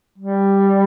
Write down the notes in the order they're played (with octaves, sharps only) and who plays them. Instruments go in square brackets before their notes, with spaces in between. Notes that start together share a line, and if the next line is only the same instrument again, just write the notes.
[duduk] G3